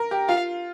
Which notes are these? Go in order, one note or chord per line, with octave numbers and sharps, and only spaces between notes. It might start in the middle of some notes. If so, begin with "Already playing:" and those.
Already playing: A#4
G4
F4 F5